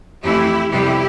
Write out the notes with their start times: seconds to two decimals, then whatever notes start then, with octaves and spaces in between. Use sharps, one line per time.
0.24 F2 E3 A3 C4 E4 G4
0.71 F2 C3 G3 B3 E4 G4